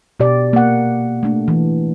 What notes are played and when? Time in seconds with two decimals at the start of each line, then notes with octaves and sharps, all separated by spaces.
0.20 B2 G4 D5
0.53 A#3 F#5
1.23 A3 D4
1.48 E3